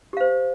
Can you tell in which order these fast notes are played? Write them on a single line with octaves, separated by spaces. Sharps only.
G4 F5 C5